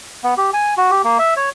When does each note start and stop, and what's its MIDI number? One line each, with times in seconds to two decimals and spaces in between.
0.24 0.34 59
0.37 0.50 67
0.54 0.74 80
0.77 0.91 66
0.91 1.02 67
1.04 1.18 58
1.19 1.34 76
1.36 1.49 73